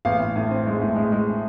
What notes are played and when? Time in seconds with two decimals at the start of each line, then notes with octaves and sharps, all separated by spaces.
0.05 A1 F5
0.20 A1
0.36 A2
0.51 C4
0.67 G#3
0.81 A2
0.96 G#3
1.12 G#3